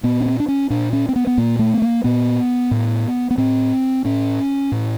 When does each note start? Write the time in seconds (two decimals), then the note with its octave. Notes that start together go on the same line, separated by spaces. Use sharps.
0.03 A#2 B3
0.21 C#4
0.26 C4
0.40 D4
0.48 C#4
0.70 A#2 D4
0.93 C#4
1.09 C4
1.16 B3
1.27 B3
1.38 A#2 A#3
1.59 A3
1.74 B3
1.82 A#3
2.04 A#2 B3
2.71 A2
3.31 B3
3.38 A2 C4
4.05 A2 C#4
4.72 A2